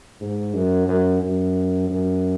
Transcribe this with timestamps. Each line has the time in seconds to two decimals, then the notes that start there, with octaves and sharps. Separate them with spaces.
0.21 G#2
0.54 F#2
0.88 F#2
1.22 F#2
1.90 F#2